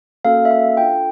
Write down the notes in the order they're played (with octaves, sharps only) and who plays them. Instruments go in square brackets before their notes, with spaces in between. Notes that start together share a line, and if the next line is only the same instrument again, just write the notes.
[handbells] A#3 C#4 F#4 A4 F5
E5
F5
D4 F4 A4 G5